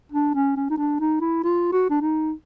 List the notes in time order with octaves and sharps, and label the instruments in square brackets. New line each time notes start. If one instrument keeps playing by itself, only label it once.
[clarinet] D4
C#4
C#4
D#4
D4
D#4
E4
F4
F#4
D4
D#4